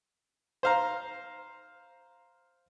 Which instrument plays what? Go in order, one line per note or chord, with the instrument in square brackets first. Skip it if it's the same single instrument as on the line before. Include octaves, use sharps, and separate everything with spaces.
[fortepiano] C5 F5 A#5